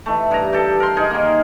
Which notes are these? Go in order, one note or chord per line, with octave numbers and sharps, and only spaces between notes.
E3 A3
G2 A#5
G4 A4
A#4 C6
D#4 G#4 A#4
D#3 A#3